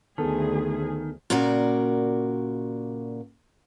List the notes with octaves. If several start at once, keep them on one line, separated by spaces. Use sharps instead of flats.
D2 D#3 B3 G#4 A4 A5
A#2 C#3 F#4 A#4 D5